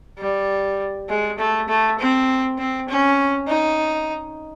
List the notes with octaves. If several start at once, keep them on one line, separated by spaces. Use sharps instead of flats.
G3
G#3
A3
A3
C4
C4
C#4
D#4